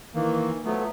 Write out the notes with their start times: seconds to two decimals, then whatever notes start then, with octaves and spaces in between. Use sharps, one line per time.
0.14 D#3 E3 A#3
0.65 F3 F#3 A3 B3